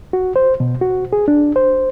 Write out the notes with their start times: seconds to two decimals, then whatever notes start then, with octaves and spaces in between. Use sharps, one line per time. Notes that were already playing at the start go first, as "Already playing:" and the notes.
0.13 F#4
0.36 C5
0.60 B2
0.81 F#4
1.13 G#4
1.28 D4
1.56 C5